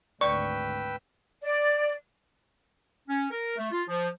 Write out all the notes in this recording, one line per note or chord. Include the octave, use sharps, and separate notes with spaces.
G#1 D2 B4 D5 G5 C#6 E6
D5
C#4
A#4
A3
F4
F3